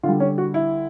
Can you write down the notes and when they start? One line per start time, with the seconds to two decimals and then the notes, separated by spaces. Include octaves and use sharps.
0.03 D3 F4
0.09 G3
0.20 C#4
0.38 F#4
0.54 E4